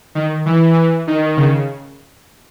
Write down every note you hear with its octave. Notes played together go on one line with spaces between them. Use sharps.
D#3
E3
E3
D#3
C#3